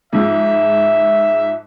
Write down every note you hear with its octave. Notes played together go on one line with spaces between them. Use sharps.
G#2 F3 G#3 E5